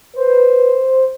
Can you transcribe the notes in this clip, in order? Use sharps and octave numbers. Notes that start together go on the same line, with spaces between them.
B4 C5